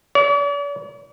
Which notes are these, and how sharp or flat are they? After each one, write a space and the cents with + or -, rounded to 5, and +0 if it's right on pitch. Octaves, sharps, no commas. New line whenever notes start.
D5 -45